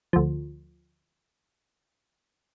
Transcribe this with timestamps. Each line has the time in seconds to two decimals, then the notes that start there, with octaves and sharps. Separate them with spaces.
0.13 D2 F3